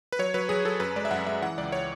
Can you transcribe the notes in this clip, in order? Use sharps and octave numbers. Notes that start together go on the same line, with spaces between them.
B4
F#3 C#5
F#3 B4
F#3 G#4
F#3 A4
F#2 B4
G#3 D5
E5
F#2 F#5
G#3 E5
E3 F#5
C#2 D5
C#5